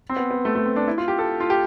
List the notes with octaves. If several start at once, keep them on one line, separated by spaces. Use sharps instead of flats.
C4
B3
B3
A3
A3
C4
D4
E4
F4
G4
A4
F4
G4